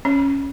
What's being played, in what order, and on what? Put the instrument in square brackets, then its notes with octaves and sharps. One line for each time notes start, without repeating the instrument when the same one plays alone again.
[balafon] C#4